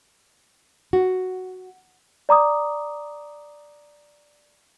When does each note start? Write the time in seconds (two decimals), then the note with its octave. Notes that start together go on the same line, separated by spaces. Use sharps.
0.93 F#4
2.29 D5 A#5 D6 D#6